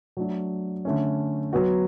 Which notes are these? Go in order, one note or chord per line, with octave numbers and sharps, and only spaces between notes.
F#3 A3 D4 F#4
D3 A3 C#4
F#3 B3 F#4